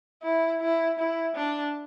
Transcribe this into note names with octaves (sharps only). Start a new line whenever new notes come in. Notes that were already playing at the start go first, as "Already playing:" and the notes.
E4
E4
E4
D4